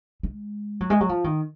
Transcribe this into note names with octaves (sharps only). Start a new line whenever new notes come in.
G#3
F#3
G#3
F#3
F3
D#3